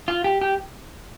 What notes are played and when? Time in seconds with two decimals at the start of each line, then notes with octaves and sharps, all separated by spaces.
0.08 F4
0.24 G4
0.41 G4